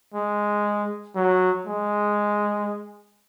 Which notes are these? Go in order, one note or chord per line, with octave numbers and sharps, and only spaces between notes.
G#3
F#3
G#3